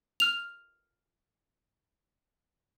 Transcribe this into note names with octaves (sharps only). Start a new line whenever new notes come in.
F6 F7